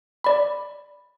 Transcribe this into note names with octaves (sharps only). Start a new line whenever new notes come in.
D5 B5